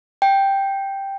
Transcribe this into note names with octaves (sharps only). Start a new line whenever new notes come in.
G5